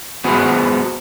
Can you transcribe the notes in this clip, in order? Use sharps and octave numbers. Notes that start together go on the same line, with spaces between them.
B3 F#4 G#4 B4 C5